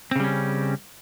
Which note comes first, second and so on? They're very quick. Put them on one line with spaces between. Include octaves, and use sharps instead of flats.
C4 C#3 G3 C#4